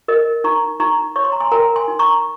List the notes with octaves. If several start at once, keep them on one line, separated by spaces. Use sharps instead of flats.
A#4 D#5
D#4 A#5 C#6
D#4 A#5 C#6
C#5 C#6
C6
A#5
G#5 C6
A#4 G5 A#5
G#5 C6
D#4
A#5 C#6